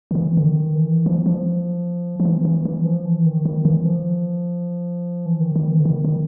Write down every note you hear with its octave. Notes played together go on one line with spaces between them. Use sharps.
D#3
E3
D3
D#3
E3
F3
F3
F3
E3
E3
E3
F3
E3
D#3
D#3
E3
F3
E3
D#3
D#3
E3
D3
D#3
D#3